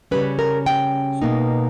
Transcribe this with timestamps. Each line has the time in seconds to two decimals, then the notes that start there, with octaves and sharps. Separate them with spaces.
0.11 C#3 G3 C#4 B4
0.39 A#4
0.66 G5
1.22 B2 A#3 D#4